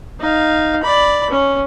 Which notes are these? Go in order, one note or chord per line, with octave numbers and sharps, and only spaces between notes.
D#4 F5
D5 B5
C#4